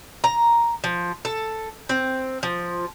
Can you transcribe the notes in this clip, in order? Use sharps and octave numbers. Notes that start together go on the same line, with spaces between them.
A#5
F3
A4
C4
F3